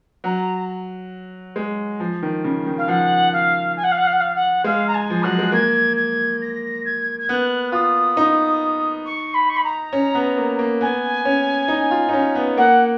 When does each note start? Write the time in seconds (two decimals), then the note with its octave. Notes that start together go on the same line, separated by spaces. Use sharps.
0.24 F#3 A#5
1.56 G#3
2.00 F3
2.22 D#3
2.44 C#3
2.66 D#3
2.78 F5
2.88 F3 F#5
3.32 F5
3.76 G#5
3.83 F#5
3.91 F5
3.97 F#5
4.06 F5
4.12 F#5
4.20 F5
4.35 F#5
4.64 G#3 F5
4.87 A#5
4.94 G#5
5.10 F3
5.22 F#3 F#6
5.39 G#3
5.52 A#3 G#6
5.96 G#6
6.41 A#6
6.85 G#6
7.19 G#6
7.28 B3 F#6
7.72 F4 D#6
8.17 D#4
9.05 C#6
9.34 B5
9.49 C#6
9.56 B5
9.64 A#5
9.93 C#4
10.15 B3
10.37 A#3
10.59 A#3
10.81 B3 G#5
11.25 C#4
11.68 D#4
11.91 F4
12.09 D#4
12.13 C#4
12.35 B3
12.57 A#3 F#5